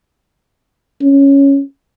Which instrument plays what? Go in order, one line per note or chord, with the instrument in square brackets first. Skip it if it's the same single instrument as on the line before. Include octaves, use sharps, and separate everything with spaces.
[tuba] C#4